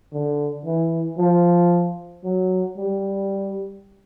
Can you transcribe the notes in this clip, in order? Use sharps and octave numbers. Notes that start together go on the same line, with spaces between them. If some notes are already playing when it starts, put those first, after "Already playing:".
D3
E3
F3
F#3
G3